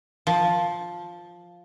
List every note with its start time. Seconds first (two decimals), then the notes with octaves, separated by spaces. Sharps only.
0.27 F3